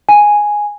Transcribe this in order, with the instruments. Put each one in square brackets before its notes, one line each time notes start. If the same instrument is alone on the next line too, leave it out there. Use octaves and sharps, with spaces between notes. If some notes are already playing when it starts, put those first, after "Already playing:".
[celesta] G#5